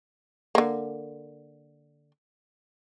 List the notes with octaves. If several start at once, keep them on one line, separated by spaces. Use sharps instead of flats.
D3 A#3